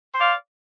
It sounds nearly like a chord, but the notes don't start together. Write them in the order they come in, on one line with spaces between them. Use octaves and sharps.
C5 D5 F5